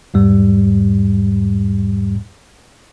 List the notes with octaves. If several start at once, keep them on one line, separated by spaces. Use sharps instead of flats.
E2 G#2 G3